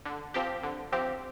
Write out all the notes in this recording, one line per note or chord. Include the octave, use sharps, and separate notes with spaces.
D3
F3 C4 G4
D3
F3 C4 G4